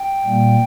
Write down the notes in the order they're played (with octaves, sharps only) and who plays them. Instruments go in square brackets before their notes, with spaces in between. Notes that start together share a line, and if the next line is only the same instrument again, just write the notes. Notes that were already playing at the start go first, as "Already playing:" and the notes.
Already playing: [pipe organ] G5
A#2 G3 A#3